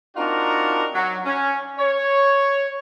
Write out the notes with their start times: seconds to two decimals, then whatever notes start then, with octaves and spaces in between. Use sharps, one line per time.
0.17 C4 D4 D#4 F4 F#4 A#4
0.94 F#3
1.26 C#4
1.79 C#5